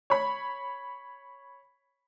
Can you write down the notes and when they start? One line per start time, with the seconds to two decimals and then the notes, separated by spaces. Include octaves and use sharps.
0.10 C#5 B5